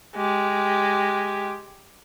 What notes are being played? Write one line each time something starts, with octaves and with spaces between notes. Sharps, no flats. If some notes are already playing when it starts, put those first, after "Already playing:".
G#3 G4